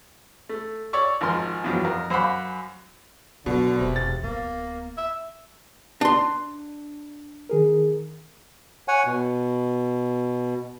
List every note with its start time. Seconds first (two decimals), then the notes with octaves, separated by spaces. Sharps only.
0.49 A3
0.93 C#5 D5 C#6 E6
1.21 G#1 F3 A#4 C6
1.64 E2 G2 F3 F#3
1.84 F2 A#4
2.10 F#2 C5 F5 F#5 B5 D6
3.46 B2 D3 F#3 F4
3.79 E1 C3
3.96 A6
4.23 D1 A#3 B3
4.98 E5
6.01 D4 C6
7.49 D#3 G#4 A#4
8.88 C#5 F#5 G#5
9.06 B2